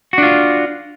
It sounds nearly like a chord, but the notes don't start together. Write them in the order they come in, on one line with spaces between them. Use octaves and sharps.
F#4 D4 F4